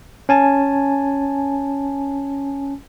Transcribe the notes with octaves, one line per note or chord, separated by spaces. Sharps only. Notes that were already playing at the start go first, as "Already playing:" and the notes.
C#4 G#5 A5